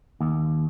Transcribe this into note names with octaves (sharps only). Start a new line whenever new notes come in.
D#2